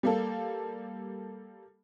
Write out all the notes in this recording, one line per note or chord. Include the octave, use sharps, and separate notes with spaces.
G3 A#3 A4